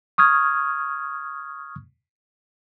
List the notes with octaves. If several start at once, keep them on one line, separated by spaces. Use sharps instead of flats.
C#6 D#6 F6 G#6